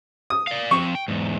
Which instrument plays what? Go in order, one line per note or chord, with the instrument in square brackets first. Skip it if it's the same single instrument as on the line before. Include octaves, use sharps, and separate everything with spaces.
[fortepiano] D#6
[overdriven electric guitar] D5 F5
[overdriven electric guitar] F3 C4 [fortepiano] C#6
[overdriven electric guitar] G5
E2 G#2